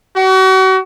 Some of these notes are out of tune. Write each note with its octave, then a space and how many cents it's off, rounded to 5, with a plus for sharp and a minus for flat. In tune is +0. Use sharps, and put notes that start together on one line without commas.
F#4 +35